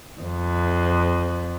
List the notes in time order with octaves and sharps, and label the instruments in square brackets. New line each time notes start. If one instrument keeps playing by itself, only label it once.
[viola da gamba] F2